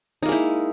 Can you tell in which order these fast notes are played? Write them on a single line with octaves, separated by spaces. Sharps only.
D#4 A#3 G#3 E4